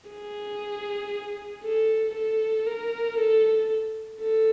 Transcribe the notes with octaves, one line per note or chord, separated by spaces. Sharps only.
G#4
A4
A4
A#4
A4
A4